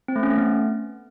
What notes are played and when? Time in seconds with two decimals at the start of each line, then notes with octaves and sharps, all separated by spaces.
0.08 C4
0.16 A3
0.23 C#4
0.30 A3
0.38 B3